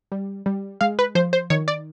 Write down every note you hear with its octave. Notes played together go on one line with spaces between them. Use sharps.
G3
G3
G#3 F5
B4
F3 C5
C5
D#3 C#5
D5